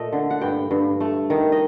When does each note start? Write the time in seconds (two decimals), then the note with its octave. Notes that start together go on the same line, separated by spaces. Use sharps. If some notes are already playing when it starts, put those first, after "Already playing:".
Already playing: A#2 A3 D#5
0.13 D3
0.30 F#5
0.41 G2 G5
0.71 G2
1.00 A3
1.30 D#3
1.52 D#5